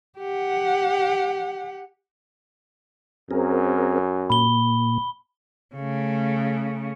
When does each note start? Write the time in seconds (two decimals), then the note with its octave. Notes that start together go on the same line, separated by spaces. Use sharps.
0.19 G4 F#5
3.31 F#2 C4 G#4 A#4
4.30 A#2 B5 G7
5.75 C#3 A3